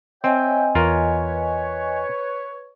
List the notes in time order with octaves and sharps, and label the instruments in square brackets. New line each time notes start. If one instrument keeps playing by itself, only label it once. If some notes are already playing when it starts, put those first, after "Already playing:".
[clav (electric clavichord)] C4 [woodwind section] C#5 E5 G5 [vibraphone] D#5 G#5
[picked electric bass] E2 [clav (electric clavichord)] F4 A#4 [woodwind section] B4 C#5